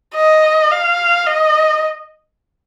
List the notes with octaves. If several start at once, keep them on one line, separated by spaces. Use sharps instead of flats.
D#5
F5
D#5